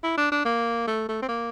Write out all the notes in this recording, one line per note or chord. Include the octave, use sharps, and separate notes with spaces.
E4
D4
D4
A#3
A3
A3
C4
A#3